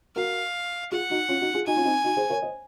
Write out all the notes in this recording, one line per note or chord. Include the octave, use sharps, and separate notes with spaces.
F#4 A#4 F5
F4 G#4 F#5
D#4 F#4
C#4 F4
D#4 F#4
F4 G#4
D#4 F#4 G#5
C#4 F4
C4 D#4
D#4 F#4
G#4 C5
A#4 C#5
C5 D#5